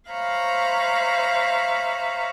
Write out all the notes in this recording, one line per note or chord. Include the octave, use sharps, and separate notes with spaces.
C5 C#5 E5 F5 A#5 B5